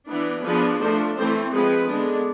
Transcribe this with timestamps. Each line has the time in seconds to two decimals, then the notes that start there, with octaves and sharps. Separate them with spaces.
0.10 E3 B3 D4
0.45 F3 B3 D4 G#4 B4
0.81 F3 A3 D4 A4 C5
1.17 E3 A3 C4 A4 C5
1.53 F3 G#3 C4 G#4 B4
1.89 D3 G#3 B3 D4